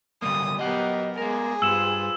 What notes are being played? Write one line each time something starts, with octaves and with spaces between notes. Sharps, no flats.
D3 G3 A#3 D#6
F#3 B3 G4 A#4 D#5 F#5
G#3 B3 G#4 A#4
G2 F4 B4 C5 E6 E7